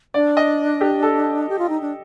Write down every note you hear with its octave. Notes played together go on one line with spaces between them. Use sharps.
D4 D5
D#5
G4
A4
G4
F4
D#4
D4